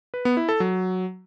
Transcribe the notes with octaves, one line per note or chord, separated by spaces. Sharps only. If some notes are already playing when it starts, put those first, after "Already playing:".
B4
B3
E4
A4
F#3